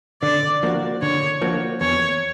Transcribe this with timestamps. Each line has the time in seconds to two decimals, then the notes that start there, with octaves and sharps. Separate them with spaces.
0.22 D3 D5
0.63 F3 A#3 D4 F#4
1.02 D3 C#5
1.42 F3 A#3 D4 F#4
1.81 E2 C#5